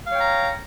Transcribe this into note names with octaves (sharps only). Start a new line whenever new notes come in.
C#5 F5 G5 A#5